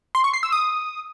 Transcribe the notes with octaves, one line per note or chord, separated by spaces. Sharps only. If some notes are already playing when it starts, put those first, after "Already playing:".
C6
C#6
C7
E6
D#6